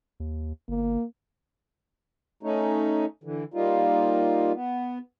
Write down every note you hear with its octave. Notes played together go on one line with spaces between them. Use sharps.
D#2
G1 A#3
A3 C#4 D#4
D3 E3
G3 A#3 D#4 F4
B3